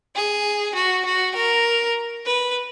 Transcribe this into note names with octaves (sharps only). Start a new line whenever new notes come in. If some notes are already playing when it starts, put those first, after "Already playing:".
G#4
F#4
F#4
A#4
B4